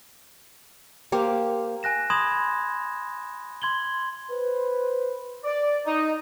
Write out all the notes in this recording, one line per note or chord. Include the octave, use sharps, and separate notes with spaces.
A#3 G4 C5 F5
G#5 F#6 A#6 E7
B5 C6 D#6 G#6 E7
C6 G#6 F#7 G7
B4 C5
D5
D#4